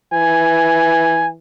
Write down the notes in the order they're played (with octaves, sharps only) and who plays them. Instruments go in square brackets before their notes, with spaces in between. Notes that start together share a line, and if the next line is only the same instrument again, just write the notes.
[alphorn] E3 [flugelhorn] G#5